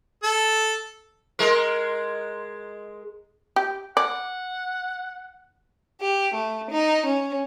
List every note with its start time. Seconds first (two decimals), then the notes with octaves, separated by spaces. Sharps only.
0.23 A4
1.39 G#3 A#4
3.56 G4
3.97 D5 F#5
6.02 G4
6.33 A3
6.71 D#4
7.06 C#4